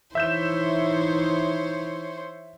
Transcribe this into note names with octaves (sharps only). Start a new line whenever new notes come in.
E3 D#4 C5 C#5 E5 G6 E7